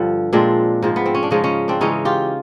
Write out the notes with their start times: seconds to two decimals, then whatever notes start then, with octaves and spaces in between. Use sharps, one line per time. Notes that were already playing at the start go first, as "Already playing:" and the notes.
Already playing: G2 D3 F3
0.33 A#2 F3 G#3 C4 D4
0.82 G#2 F3 G#3
0.96 B3
1.06 C4
1.15 C#4
1.23 D4
1.31 C#3 F3 G#3 C#4 D#4
1.44 C#4 D#4
1.68 C4 D4
1.81 C#3 E3 G#3 C#4 D#4
2.05 F4 G4